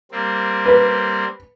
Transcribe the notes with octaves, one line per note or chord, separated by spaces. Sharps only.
G3 A#3 C4
B4